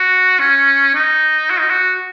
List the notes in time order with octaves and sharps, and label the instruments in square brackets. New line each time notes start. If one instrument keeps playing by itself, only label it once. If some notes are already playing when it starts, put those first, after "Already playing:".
Already playing: [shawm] F#4
C#4
D#4
F#4
D#4
F#4